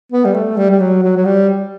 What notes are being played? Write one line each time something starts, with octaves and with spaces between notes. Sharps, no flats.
B3
G3
A3
G3
G3
F#3
F#3
F#3
G3